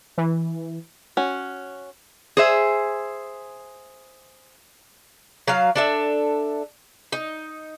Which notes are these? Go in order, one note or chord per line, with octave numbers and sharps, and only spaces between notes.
E3
C#4 F#4
G#4 C5 E5
F#3 F5
D4 A4 E5
D#4